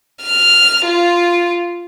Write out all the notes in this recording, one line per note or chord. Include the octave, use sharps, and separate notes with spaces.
F6
F4